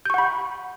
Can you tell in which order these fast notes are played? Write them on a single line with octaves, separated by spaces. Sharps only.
G6 C#6 F#5 B5